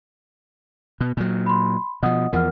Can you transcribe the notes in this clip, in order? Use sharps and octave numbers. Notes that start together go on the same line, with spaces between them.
B2
A#2 F#3
B5 C6
B2 F3 D#5 F#5 D#6
E2 F3 A#4 F#5 F6